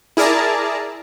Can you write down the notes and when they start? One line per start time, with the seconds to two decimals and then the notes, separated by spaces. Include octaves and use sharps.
0.17 E4 G#4 A#4 D5 A5 A#5